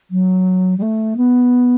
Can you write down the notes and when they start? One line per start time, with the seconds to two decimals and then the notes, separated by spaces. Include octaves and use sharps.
0.10 F#3
0.77 G3
0.81 A3
1.16 B3